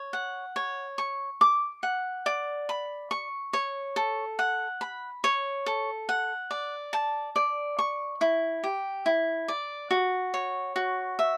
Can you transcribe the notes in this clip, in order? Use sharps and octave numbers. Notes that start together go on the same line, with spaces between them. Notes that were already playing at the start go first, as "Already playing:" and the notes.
Already playing: C#5
F#5
C#5
C#6
D6
F#5
D5
B5
C#6
C#5
A4
F#5
B5
C#5
A4
F#5
D5
A5
D5
C#6
E4
G4
E4
D5
F#4
C#5
F#4
E5